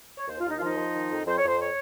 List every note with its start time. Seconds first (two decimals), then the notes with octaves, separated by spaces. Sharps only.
0.18 C#5
0.28 D#2 C5
0.39 F4
0.45 D#2
0.50 D#4
0.57 F4
0.61 F3 D#4
0.77 F3
0.94 D#3
1.10 F2
1.26 F2 C5
1.38 C#5
1.43 F2
1.48 C5
1.59 C#5